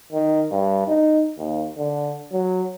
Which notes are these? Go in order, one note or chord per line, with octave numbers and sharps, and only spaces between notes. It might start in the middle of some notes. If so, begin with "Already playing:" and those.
D#3
G2
D#4
D#2
D3
F#3